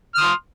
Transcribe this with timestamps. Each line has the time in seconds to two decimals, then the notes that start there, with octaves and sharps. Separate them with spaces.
0.15 F6
0.17 D#6
0.20 C6